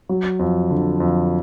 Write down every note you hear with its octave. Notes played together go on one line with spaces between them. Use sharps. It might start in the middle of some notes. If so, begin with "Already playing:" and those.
F#3
F2
D3
F2